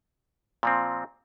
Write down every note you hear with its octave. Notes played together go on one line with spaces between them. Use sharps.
A#2 F3 C4